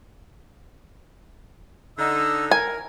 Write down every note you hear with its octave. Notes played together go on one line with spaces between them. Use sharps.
D3 D#4 E6
A#4 G#5